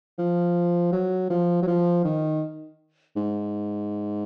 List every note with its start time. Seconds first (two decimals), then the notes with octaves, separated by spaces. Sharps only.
0.19 F3
0.92 F#3
1.30 F3
1.62 F#3
1.67 F3
2.04 D#3
3.16 G#2